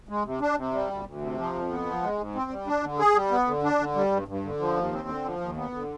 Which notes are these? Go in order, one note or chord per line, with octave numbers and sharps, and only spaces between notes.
G#3
C3
D4
C3
G3
D2
D2
C3
F3
F2
B3
F3
G#3
G#2
C4
G3
D4
D3
G#4
G3
B3
D3
D4
D3
G3
G2
G2
D3
F3
D#2
C4
D3
F3
D#2
B3
D3